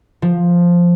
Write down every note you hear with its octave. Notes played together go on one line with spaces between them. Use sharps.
F3